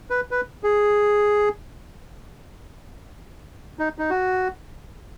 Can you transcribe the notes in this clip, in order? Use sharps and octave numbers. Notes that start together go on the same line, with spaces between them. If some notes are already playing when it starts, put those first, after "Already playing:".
B4
B4
G#4
D#4
D#4
F#4